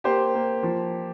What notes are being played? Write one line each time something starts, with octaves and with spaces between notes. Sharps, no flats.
A#3 G4 C5
A#3
F3